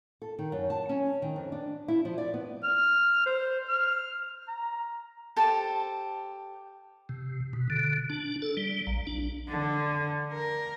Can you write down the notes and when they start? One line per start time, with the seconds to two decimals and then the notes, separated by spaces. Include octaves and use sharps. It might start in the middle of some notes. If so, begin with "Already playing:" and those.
0.22 A4
0.39 D#3
0.52 F#2
0.70 A5
0.89 C#4
1.22 D#3
1.36 F2
1.52 D4
1.88 E4
2.05 F3
2.18 D5
2.34 B3
2.63 F6
3.26 C5
3.69 F6
4.48 A#5
5.36 G4 A4 C5 A5
7.09 C3
7.53 B2
7.70 D3
8.10 D4
8.42 A4
8.57 G3
8.87 A#1
9.07 D4
9.49 D3
10.33 A#4